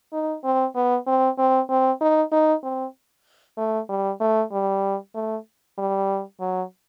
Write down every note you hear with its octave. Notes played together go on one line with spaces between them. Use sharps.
D#4
C4
B3
C4
C4
C4
D#4
D#4
C4
A3
G3
A3
G3
A3
G3
F#3